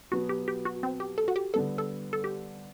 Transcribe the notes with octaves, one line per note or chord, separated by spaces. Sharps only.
B2 F#3 B3 F#4
G4
G4
F#4
C4
G4
A4
F#4
G4
D3 G3 B3 A4
A4
A4
G4